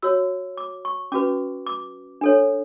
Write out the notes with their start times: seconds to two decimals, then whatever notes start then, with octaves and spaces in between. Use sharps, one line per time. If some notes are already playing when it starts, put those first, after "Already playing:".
0.03 F#4 C#5 E6
0.57 D6
0.85 C#6
1.12 C#4 F#4 B4 D6
1.67 D6
2.21 D4 A4 C#5